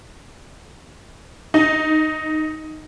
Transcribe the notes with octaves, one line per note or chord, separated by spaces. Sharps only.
D#4